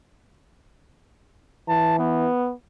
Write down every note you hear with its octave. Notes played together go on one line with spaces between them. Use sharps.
E3 A5
B3